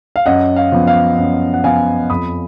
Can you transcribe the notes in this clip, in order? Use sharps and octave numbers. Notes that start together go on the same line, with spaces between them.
F5
F#2 D#5 F#5
F5
F3 B3
F5
F#2
F#5
F3 B3 F5 G#5
F2 B5 D#6